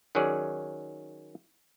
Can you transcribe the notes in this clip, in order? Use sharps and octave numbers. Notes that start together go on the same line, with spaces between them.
D#3 F#3 C#4 G#4 D5